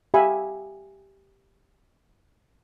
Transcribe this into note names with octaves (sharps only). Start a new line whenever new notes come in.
G4 E5 F5 G#5 B5